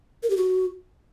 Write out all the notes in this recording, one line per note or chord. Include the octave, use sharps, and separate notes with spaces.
A#4
G4
F#4